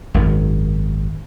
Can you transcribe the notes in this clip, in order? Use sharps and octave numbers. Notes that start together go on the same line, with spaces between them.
G#1 F#2